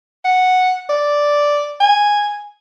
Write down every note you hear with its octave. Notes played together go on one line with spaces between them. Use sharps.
F#5
D5
G#5